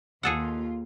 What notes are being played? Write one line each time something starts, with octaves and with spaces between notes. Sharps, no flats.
D#2 F4 G#4 A4 F#5